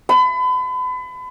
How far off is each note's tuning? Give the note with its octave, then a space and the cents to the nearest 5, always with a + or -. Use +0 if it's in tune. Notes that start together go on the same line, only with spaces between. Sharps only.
B5 +35